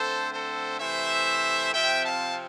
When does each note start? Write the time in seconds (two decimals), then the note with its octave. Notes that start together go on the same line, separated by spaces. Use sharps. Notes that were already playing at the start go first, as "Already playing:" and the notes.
Already playing: D3 A3 C4 A4 C5
0.32 A4 C5
0.79 C3 E3 A3 C5 E5
1.72 C3 F3 C4 E5 G5
2.04 F5 A5